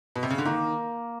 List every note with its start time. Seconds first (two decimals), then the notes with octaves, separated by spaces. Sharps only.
0.16 B2
0.23 C3
0.30 C#3
0.38 D3
0.45 D#3 A#3